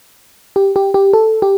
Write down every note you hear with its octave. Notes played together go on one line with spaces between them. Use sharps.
G4
G4
G4
A4
G4